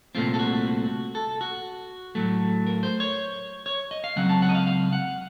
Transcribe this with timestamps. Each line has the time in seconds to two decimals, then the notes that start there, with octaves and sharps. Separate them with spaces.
0.15 C2 A#2 A3 C4 F4
0.34 A4
0.39 F#4
1.15 A4
1.41 F#4
2.15 A2 F#3 A3
2.67 A#4
2.83 C5
3.00 C#5
3.66 C#5
3.91 D#5
4.04 F5
4.16 C#2 C#3 F#3 C4 F#5
4.29 A5
4.42 F#5
4.49 D#5
4.55 F5
4.67 F5
4.93 F#5